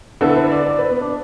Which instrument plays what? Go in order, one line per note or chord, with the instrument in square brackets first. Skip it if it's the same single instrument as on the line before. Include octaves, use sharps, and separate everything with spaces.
[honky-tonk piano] D3 B3 E4 [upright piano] A4
[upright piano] B4
D5
D5
B4
B3
D4